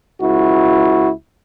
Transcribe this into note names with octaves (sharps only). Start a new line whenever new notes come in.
C#2 E4 F#4